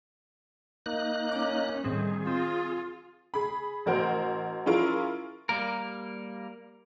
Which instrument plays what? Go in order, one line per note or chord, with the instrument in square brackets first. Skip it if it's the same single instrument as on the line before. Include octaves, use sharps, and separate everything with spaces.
[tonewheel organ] A#3 D#4 F#6
[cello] C#4 [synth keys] D6
[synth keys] A2 C4 [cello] D#3 G3 [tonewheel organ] G#4
[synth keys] C4 [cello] F4
[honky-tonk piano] G#4 B5
A1 F#4 A#4 C5
C#4 E4 F4 G#4 A#4
[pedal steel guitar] G3 A#3 A#4